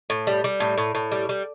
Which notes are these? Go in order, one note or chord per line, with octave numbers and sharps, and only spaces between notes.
A2
G3
G3
A2
A2
A2
G3
G3